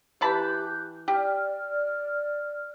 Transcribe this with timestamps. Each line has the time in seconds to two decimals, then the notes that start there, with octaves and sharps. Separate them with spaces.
0.21 E3 G4 A5 B5 F#6 G6
1.08 G4 D5 F6